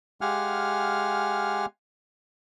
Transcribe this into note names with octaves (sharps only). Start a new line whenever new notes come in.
G#3 G4 F5 F#5 G#5 F6